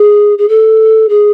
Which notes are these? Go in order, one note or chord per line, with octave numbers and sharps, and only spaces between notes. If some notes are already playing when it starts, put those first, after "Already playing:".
Already playing: G#4
G#4
A4
G#4